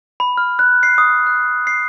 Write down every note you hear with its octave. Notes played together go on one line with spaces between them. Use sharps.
B5
F6
F#6
C7
D#6
F#6
C7